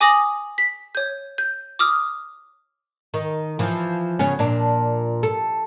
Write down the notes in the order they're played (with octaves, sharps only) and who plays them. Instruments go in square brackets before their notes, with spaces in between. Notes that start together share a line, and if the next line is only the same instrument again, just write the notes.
[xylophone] G#5 D6 D#6 A#6 F#7
B6
C#5 G6
G6
D6 D#6 F6
[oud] D#3
E3 F3
C#3 B3 C#4
A#2 D4
A4